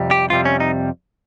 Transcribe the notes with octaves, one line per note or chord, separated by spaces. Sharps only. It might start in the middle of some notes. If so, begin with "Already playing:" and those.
Already playing: F2 C3 G3
G4
F2 C3 G3 F4
C#4
D#4